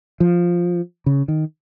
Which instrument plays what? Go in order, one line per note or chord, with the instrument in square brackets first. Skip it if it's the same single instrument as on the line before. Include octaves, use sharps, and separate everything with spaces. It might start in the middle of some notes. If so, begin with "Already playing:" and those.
[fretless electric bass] F3
C#3
D#3